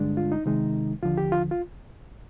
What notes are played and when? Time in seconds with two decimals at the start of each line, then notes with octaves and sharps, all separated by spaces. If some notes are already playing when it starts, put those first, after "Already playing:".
Already playing: G2 D3 G#3 D4
0.17 F4
0.32 D#4
0.46 C3 D#3 G#3 D#4
1.03 D#2 D3 F3 F4
1.18 G4
1.32 F4
1.51 F4